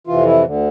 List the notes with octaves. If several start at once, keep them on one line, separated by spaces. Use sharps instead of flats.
F2 C3 E3 F4
E4
D2 D3